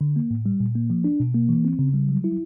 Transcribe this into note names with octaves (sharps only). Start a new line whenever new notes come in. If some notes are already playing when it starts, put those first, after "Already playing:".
D3
A#3
A2
G3
A#2
A#3
F3
D4
B2
A#3
E3
C4
C#3
G3
F#3
E4